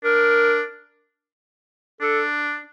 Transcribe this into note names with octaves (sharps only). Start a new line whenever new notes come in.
D4 A#4
D4 A4